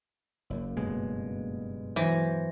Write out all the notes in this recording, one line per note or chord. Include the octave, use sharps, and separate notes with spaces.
F#1 F#2 A#3
G2 B2 G#3
E3 F#3 C5 A#6